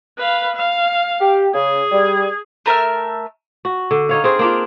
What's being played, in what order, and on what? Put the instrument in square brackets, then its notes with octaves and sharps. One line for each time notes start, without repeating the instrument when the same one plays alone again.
[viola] B4 F5
F5
[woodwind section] G4
[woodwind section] C#3 [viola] G#4
[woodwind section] G3
[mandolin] A3 A#4 E5 F6
[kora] F#4
D3
D#4 C#5 F5
C4 G#4 C5
A#3 D4 F4